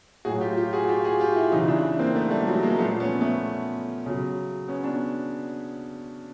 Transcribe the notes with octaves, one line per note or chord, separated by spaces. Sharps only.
A2 F#3 F#4 G#4
F4 G4
F4 G4
F#4 G#4
F#4
F4 G4
F#4 G#4
F4 G4
E4 F#4
C#3 E3 D#4 F4
D4 E4
A#3 C4
A3 B3
G3 A3
F#3 G#3
G#3 A#3
A#2 F3 A3 B3
B3 C#4
A3 B3
C#3 F#3
B3 C#4
D4